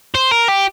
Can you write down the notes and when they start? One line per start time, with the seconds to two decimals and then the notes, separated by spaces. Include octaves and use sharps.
0.15 C5
0.31 A#4
0.48 G4